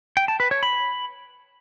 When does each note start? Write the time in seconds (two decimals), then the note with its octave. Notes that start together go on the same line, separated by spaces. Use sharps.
0.17 G5
0.28 A5
0.40 B4
0.51 C#5
0.63 B5